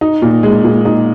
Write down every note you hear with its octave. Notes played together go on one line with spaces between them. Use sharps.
D#4
A#2
G#3
A#2
D#4